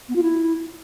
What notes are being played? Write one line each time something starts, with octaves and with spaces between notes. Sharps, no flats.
B3
F4
E4